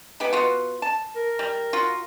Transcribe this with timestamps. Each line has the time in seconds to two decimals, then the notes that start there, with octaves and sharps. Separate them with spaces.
0.20 G#3 B3 G4
0.33 B3 F4 F#4
0.82 A5
1.16 A#4
1.39 G3
1.73 F4 F#4